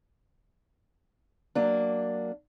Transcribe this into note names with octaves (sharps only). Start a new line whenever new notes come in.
F#3 A#3 D4